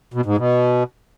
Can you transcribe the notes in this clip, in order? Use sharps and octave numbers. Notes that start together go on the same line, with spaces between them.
B2
G#2
B2